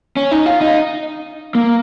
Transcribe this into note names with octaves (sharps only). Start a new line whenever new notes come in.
C#4
D#4
F4
D#4
A#3